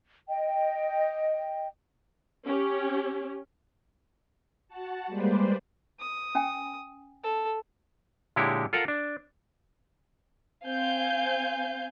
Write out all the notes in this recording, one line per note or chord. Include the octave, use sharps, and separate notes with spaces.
D#5 G5
C#4 G4
F#4 F#5 A5
G3 G#3 A#3 B4 C5 D5
D#6
C#4 G5 G#5
A4
A#2 D3 G#3 E4 G4 C#5
F4 A4 A#4 F5 F#5 A#5
D4
C4 F5 G#5 G6